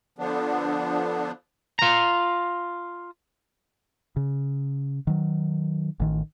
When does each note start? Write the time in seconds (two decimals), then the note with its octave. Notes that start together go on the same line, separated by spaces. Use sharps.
0.18 D3 F3 B3 D4
1.79 F4 A#5
4.16 C#3
5.07 D#3 F#3
6.00 A1 D#3